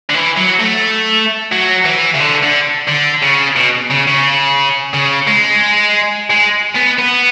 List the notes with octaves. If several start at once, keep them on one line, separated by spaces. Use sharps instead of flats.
D3
E3
F#3
A3
F#3
E3
C#3
D3
D3
D3
C#3
B2
C#3
C#3
C#3
G#3
G#3
B3
B3